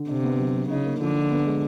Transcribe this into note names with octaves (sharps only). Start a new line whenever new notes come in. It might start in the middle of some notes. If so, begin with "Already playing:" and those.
Already playing: D3
C3 D4
B3
F#3
F#3
C#3 D#4
A#3
D3 F3
F3
B3
G#3